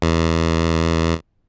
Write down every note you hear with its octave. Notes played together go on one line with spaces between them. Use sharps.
E2